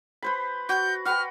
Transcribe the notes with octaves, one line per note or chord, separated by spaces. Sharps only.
B4 C5 B5
F#4 G6
F#4 B4 G5 F6